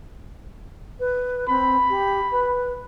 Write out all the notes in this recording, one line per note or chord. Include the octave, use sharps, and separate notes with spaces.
B4
C4 B5
G4
B4